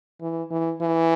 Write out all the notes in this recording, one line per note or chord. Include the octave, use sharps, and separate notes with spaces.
E3
E3
E3